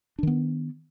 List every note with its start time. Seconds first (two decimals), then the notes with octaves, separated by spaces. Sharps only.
0.19 D4
0.23 D#3
0.27 B3